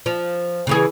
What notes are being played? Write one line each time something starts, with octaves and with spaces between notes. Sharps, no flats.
F3
C#3 E3 G#4